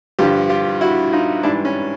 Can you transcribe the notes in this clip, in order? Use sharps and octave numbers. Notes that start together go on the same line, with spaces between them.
G2 D3 F3 F4 G4
F4 G4
E4 F#4
D#4 F4
G#2 E3 G3 D4 E4
C#4